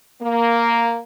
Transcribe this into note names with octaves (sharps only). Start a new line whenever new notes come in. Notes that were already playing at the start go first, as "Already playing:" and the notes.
A#3